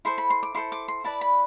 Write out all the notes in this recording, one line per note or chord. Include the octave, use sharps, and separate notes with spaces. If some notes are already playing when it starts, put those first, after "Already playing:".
E4 A4 C5 C6
B5
C6
D6
E4 A4 C5 C6
D6
C6
E4 B4 D5 A5
B5